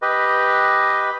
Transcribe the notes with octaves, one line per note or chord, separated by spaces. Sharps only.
G4 B4 D#5